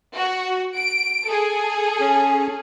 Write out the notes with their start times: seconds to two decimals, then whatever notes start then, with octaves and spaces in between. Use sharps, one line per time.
0.17 F#4
0.77 D7
1.29 G#4 A4
2.00 C#4